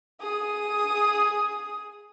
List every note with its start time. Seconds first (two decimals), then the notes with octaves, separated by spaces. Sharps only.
0.20 G#4 D#6